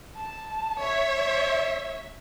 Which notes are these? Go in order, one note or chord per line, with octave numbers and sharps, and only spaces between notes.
A5
C#5 E5